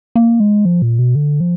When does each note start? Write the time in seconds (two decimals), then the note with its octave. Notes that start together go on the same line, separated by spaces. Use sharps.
0.16 A#3
0.40 G#3
0.65 F3
0.82 A#2
0.99 B2
1.15 D3
1.40 F3